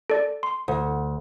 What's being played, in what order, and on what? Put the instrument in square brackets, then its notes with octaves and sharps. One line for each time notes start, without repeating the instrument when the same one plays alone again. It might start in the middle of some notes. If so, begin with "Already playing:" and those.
[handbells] A4 D5
C6
[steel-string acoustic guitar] D2